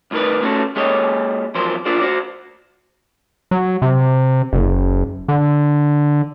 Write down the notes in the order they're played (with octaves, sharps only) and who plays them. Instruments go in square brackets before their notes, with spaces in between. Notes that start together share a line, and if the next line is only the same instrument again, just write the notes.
[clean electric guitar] C2 A2 D#3 A#4 B4
A3 C#4 D#4 F#4 A4
G#3 A#3 G4 A4 C#5 D#5
E2 F3 F#3 A#4 C5
D4 F4 A#4 C5 D5
F#4 C5
[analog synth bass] F#3
C3
F#1
D3